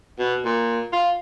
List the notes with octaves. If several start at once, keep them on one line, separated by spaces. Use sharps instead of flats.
B2
A#2
F4